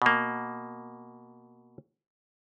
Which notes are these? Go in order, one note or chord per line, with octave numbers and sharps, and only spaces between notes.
B2 A#3